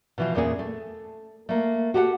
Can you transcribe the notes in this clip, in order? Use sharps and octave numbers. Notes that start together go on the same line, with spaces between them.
B2 E3 F3
E2 A#2 A#3 C#4 F4 G#4
A3
A3 A#3
F#4 G4 A4 B4 F#5